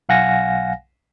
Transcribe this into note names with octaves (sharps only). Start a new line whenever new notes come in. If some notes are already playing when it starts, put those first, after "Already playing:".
B1 F5 F#5 G#5 A#6